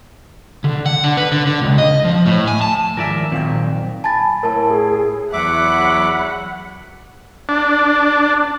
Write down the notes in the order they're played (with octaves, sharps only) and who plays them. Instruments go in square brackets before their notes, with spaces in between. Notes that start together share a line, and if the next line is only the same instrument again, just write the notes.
[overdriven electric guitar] D3
F#5
D3
B4
D3
D3
C#2
D#5
F3
A2
G#5
A5
[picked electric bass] G#2 D#3 F3 [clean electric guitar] A#4 D5 E5 [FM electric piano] F5 G#5
[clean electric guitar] F2 [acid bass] A#2 [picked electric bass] D#3 C4 [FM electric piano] F#3 F5 G5
[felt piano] G#5 B5 [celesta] A5 A6
[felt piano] A2 [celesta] A#4 A5
[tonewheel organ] G#4
[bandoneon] E2 E5 D6 [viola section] F#3 F#5 B5
[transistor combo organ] D4